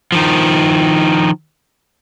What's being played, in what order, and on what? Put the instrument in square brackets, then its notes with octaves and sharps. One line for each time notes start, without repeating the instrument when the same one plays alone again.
[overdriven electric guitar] D#3 F3